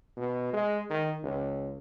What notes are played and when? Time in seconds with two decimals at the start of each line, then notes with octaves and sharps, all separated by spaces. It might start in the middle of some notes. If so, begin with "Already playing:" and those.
0.17 B2
0.54 G#3
0.90 D#3
1.24 C#2